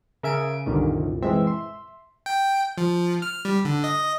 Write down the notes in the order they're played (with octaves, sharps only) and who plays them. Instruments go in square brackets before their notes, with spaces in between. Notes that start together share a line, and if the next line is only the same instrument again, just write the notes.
[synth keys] C#3 D7 D#7 [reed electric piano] A#4 E5 G#5
[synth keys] C2 F#2 A#2 [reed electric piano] D3 D#3 C#4
[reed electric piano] E3 G#3 C4 [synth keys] E5
[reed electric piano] C6
[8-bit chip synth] G5
F3
F6
G3
D3
D#5